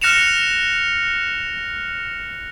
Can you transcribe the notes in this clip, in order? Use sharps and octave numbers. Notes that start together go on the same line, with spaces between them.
F6 F#6 A#6 C#7 E7 F7